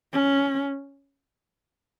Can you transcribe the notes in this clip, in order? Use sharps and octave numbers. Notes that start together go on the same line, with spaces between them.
C#4